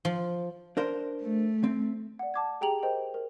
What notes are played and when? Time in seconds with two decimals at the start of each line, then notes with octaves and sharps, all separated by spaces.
0.05 F3
0.77 D4 A#4 C5
1.21 A3
1.64 C4
2.19 D5 F#5
2.34 A5 D6 G#6
2.61 G4 G#4 G5 A#5 F7 F#7
2.83 A#4 C5 D#5 G5
3.14 A#4